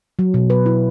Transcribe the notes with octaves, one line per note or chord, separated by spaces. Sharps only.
F#3
B2
B4
E4